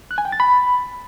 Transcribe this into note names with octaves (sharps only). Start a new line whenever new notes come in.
F#6
G#5
G5
A6
B5